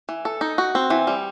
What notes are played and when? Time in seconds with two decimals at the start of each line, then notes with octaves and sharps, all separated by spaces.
0.09 E3
0.25 A4
0.41 D#4
0.58 F#4
0.75 C4
0.90 E3
1.07 G3